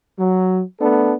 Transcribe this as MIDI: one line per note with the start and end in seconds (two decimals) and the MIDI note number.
0.18 0.61 54
0.80 1.13 57
0.80 1.13 59
0.80 1.13 62
0.80 1.13 69